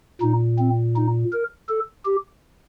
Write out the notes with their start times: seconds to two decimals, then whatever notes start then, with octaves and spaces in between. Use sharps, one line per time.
0.21 A#2 D#4
0.59 C4
0.96 D#4
1.32 A#4
1.69 A4
2.05 G4